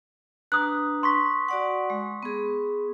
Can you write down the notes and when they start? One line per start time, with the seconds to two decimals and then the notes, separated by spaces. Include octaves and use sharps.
0.52 D4 B4 A#5 D#6 F#6
1.03 C6 C#6 B6
1.48 F#4 D5 F#5
1.90 G#3
2.23 B3 G#4